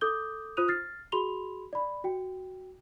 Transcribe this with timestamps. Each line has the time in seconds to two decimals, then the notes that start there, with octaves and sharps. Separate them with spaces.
0.01 A4 D6 D#6 G6 G7
0.57 F4 C5 D#6 F#6 D#7 F7
0.68 F6 A6 C7
1.12 F#4 G#4 B5 C6 F7 G7
1.73 D5 B5
2.04 F#4 G5